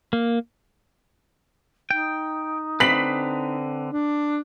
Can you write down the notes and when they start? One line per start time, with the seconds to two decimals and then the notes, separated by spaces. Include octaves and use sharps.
0.13 A#3
1.91 D#4 G5
2.80 D3 C4 B4 B6 F#7
3.89 D4